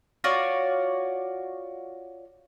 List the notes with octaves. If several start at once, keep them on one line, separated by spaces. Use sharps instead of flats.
F4 F#4 C#5 D5